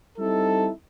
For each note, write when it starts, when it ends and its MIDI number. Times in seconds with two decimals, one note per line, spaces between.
0.18 0.70 55
0.18 0.70 60
0.18 0.70 63
0.18 0.70 64
0.18 0.70 69